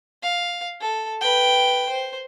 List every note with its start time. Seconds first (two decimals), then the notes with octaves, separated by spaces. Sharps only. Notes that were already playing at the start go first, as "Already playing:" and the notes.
0.23 F5
0.81 A4
1.21 B4 G5
1.89 C5